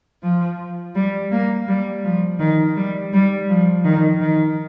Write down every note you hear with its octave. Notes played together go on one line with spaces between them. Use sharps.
F3
G3
A#3
G3
F3
D#3
G3
G3
F3
D#3
D#3